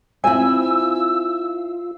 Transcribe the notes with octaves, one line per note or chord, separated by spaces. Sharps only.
C4 E4 F4 G#5 E6